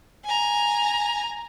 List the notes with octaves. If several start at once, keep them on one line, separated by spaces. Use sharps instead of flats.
G#5 A#5